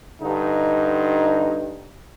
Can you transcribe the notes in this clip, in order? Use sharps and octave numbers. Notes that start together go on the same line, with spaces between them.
G2 D3 D#4